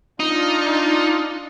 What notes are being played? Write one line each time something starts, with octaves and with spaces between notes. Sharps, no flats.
D4 D#4 F4